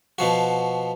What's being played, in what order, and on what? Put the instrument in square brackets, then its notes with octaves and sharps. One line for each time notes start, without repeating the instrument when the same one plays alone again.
[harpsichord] B2 F3 F#4